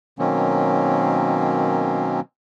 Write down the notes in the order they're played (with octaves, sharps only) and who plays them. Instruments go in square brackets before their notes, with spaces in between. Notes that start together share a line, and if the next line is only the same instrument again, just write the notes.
[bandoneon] B2 D#3 F#3 A#3 C4 C#4